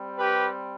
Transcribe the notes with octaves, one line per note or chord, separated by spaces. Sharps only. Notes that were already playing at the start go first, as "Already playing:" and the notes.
Already playing: G3 C4
G4 B4